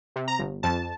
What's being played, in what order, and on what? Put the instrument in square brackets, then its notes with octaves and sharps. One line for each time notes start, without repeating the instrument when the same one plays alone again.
[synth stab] C3
A#5
G1
F2 A5